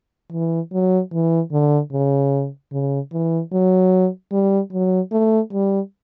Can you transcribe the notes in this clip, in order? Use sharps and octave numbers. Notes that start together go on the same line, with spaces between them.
E3
F#3
E3
D3
C#3
C#3
E3
F#3
G3
F#3
A3
G3